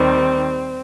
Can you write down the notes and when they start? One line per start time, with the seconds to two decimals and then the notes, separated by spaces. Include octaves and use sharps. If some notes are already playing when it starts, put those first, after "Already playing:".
Already playing: D#2 D#3 G3 C4